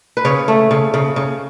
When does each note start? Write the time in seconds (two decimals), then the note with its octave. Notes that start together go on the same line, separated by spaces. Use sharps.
0.17 B4
0.25 C#3 C#5
0.48 A3
0.71 C#3
0.94 C#3
1.16 C#3